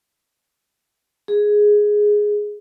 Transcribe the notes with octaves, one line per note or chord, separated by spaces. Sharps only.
G#4